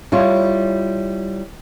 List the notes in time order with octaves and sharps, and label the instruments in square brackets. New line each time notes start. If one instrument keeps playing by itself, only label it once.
[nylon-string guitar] G3 E4 F4 C#5